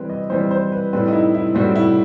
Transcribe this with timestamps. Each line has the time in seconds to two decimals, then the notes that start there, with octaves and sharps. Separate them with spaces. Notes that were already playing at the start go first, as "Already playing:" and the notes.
Already playing: E3 G3 C4 B4
0.10 D#5
0.30 E3 G3 C4 C5
0.51 C5
0.72 B4
0.93 A2 G3 C4 B4
1.08 D#4
1.13 E4
1.34 E4
1.55 A2 G3 C4 F#4
1.75 E4